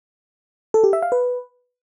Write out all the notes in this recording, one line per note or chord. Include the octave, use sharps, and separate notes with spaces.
A4
G4
E5
F5
B4